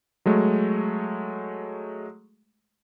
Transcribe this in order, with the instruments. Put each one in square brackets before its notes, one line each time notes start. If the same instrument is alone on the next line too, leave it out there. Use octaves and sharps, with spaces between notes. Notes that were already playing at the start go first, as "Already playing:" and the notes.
[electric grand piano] F#3 G#3 A3